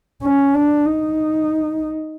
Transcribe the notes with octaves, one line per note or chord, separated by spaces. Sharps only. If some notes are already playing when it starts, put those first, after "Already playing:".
C#4
D4
D#4